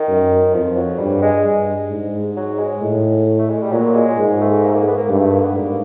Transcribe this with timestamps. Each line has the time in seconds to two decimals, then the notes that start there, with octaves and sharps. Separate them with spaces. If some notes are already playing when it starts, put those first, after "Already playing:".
Already playing: D#3
0.08 F#2
0.54 F2 F3
0.76 F#3
0.99 G2 G3
1.22 G#3
1.45 G2
1.91 G#2
2.36 F#3
2.59 G#3
2.81 A2
3.38 A3
3.49 G#3
3.61 G3
3.72 A#2 F#3
3.95 G#3
4.18 G#2
4.41 A3
4.63 A#3
4.70 A3
4.75 A#3
4.87 B3
4.97 A#3
5.09 G2 A3
5.20 A3
5.32 A#3
5.43 B3
5.54 G#2 A#3